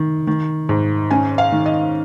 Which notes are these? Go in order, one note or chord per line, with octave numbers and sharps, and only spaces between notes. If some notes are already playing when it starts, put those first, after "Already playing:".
Already playing: D#3
D#3
G#2
C#4 G#5
F5
D#3
D#5